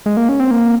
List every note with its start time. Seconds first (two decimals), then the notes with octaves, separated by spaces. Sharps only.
0.06 G#3
0.17 A#3
0.29 C#4
0.40 C4
0.51 A#3